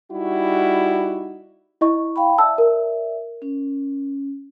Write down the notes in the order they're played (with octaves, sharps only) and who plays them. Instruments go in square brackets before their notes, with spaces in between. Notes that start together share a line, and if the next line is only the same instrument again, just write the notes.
[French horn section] G3 D#4 E4 F#4
[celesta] E4 D#5 C#6
[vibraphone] F5 G5 B5
[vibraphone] D5 E5 [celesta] A5 E6
[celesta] A#4
[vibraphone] C#4